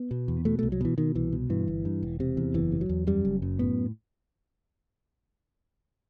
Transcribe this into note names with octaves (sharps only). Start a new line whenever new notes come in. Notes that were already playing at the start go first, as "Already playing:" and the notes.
Already playing: B3
B2
E2
B2 A3
C2 A3
F#3
B2 E3
B2 D#3
C2 E3
B2
G2 E3
G1
G2
E1
C3
E2
F#1 E3
C3
F#3
E2
F#2 G3
F#1
F#2
A2 B3